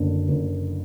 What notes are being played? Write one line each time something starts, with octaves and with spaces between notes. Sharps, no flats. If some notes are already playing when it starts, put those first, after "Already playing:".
Already playing: F#1 D3
F#1